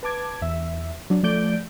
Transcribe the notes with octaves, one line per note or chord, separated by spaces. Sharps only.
B4 A5 D6 G#6
E2 E5
F#3 D4
F3 A3 D5 G6 D7